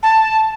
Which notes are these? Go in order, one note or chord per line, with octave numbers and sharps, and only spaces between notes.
A5